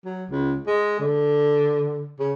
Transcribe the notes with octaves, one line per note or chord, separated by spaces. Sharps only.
F#3
C#2
G#3
D3
C#3